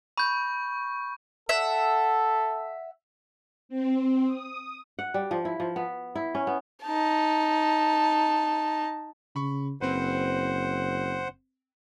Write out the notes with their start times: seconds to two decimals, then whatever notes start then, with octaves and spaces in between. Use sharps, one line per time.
0.17 B5 C#6 G6
1.49 A4 E5 F#5
3.69 C4
4.27 D#6
4.99 F#5
5.14 G3
5.31 F3
5.45 E4
5.60 F3
5.76 B3
6.15 E4
6.35 C#4
6.47 B3
6.85 D#4 A5
9.36 C#3 B5 C#6
9.81 F#1 C4 B4 C5 F#5